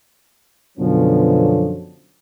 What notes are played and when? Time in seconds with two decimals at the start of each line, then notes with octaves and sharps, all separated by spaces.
0.78 F#2 B2 D3 F3 F#3 C#4